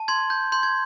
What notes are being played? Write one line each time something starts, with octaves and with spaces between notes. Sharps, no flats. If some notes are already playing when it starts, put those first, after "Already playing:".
Already playing: A5
C6 G#6
G6
C6 G6
G#6